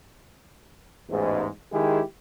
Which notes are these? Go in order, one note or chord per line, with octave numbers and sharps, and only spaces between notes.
A1 E2 G#2
D#3 G#3 E4 G4 G#4